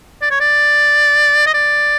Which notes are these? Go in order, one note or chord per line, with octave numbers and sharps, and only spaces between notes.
D5
C#5
D5
D#5
D5